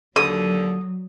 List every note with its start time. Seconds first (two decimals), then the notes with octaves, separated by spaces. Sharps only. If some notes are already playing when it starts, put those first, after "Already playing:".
0.16 D#2 D3 F#3 D#6